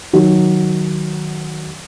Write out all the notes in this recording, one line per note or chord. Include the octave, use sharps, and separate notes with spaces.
D#3 F#3